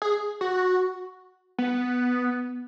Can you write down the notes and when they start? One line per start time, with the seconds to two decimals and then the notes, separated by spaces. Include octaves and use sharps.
0.02 G#4
0.41 F#4
1.58 B3